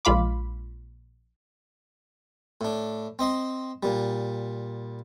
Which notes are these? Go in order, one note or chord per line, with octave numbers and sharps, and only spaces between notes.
A#1 G#3 F4 F5 B5 D6
A2 D4
C4 D#5 C6
A#2 G3